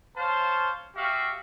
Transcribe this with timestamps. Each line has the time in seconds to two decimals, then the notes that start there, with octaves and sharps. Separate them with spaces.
0.17 C5 C#5 F5 A5
0.96 F#4 G4 E5 F5